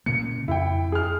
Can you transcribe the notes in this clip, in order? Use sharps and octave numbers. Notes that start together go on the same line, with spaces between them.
A#2 C#3 A#3 C#7
F2 E4 G5
G#4 F6